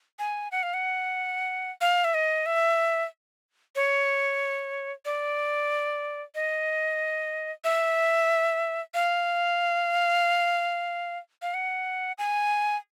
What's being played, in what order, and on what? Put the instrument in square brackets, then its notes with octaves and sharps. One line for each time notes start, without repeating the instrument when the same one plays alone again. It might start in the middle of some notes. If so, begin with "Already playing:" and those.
[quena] G#5
F#5
F5
F#5
F5
E5
D#5
E5
C#5
D5
D#5
E5
F5
F5
F#5
G#5